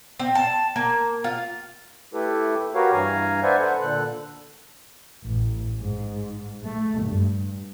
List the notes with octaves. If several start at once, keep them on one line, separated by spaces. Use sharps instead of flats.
C4
A5
A#3
F4
A3 E4 G4 A4 B4
F#4 G4 A#4 B4 C#5 F5
G2 E3 F5 G#5 A#5
B4 C5 D5 E5 F#5 G#5
A4 B4 C5 F#5
A#2 D3 A4 F#6
A1
G#2
A3
G2